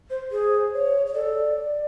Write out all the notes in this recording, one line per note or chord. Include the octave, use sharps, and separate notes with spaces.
C5
G#4 C5
C#5
C#5
A4 D5